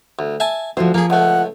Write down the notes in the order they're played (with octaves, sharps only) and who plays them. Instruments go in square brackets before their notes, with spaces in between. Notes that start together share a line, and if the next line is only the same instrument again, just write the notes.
[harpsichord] D2
E5 G#5 A5
[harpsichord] D2 [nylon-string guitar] F3 F#4 C5
[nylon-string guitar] F3 [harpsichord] A#3 G#4
[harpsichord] C#2 A3 [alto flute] F#5